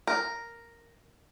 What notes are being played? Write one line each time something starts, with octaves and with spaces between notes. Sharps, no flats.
A#4